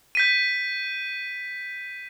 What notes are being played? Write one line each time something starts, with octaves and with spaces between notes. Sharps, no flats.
G6 B6 D#7